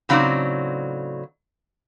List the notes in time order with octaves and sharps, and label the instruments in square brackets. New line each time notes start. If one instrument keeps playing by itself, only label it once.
[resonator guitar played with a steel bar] A2 C#3 F#3 C4 D#4 D5